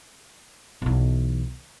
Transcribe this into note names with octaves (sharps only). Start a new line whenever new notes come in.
B1 E3